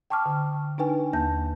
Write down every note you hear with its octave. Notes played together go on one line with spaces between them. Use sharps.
G5 A5 C#6 D6 F6
D3
D4 D#4 B4 G5 G#5
D#2 A#3 A5 G6